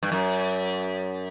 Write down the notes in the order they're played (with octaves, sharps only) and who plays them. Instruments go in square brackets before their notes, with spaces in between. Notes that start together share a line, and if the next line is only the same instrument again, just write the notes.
[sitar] G2
F#2